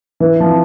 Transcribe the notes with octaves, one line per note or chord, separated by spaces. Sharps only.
E3
F3